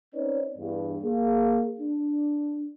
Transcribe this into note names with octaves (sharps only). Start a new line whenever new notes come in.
C4 C#4 D#4 B4 C#5 D5
E2 G2
A#3 G#4
D4